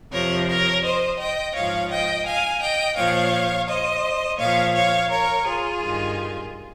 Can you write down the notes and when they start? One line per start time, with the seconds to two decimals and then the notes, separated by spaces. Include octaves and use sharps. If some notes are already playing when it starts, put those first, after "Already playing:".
0.12 F2 C3 F3 A#4 C#5
0.48 A#4 C#5
0.84 C5 D#5
1.19 D#5 G5
1.55 G#2 F3 C#5 F5
1.90 D#5 G5
2.26 F5 G#5
2.62 D#5 G5
2.97 A#2 F3 C#5 F5
3.68 C5 D#5
4.39 A#2 F3 C#5 F5
4.75 C#5 F5
5.10 A#4 C#5
5.46 F4 G#4
5.82 G2 D#3